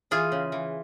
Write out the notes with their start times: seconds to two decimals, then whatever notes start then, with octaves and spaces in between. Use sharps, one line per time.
0.11 E3 F4 G#4
0.32 C#3
0.52 E3